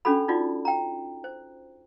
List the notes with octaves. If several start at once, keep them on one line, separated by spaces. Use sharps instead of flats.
C#4 D4 F#4 A4 B5
D#4 F4 F#4 D5
G5 A#5
C5